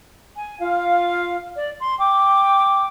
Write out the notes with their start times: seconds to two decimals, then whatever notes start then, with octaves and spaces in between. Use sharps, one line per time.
0.36 G#5
0.59 F4 F5
1.57 D5
1.80 C6
1.99 G5 D6